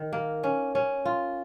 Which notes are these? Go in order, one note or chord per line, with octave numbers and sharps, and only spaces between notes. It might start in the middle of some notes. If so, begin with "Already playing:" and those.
Already playing: D#3
A#3
C#4
C#4
F4